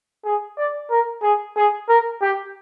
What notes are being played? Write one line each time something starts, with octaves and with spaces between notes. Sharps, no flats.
G#4
D5
A#4
G#4
G#4
A#4
G4